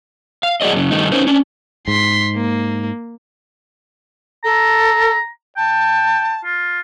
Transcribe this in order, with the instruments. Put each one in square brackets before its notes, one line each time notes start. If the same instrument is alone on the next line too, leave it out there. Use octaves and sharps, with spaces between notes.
[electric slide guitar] F5
F#2 F#4 G#4 D5 D#5
F#2 C#3
G2 D#3 A3 D#4
C#4 D#4 A#4 C5
C#4 D4
[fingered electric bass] G#2 [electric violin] C6 B6
[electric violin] A#3
[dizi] A4 [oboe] A#5
[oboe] G5 [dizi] A5
[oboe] F4